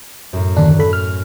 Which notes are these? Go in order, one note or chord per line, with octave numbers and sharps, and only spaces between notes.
F#2 A2
D#2 D3 D4 F#6
A4 B5
F6